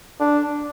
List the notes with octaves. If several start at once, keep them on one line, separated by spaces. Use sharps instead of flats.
D4